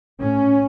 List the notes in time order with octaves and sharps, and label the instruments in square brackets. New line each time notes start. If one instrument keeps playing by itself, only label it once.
[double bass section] A2 C#4